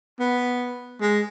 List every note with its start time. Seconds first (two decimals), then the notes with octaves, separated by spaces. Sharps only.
0.20 B3
1.01 G#3